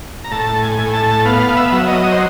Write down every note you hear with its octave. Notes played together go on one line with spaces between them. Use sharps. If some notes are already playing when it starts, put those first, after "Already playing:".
A#5
A2 A5
G#5
A2
A5
B3 F5
E5
F#3
D#5
C5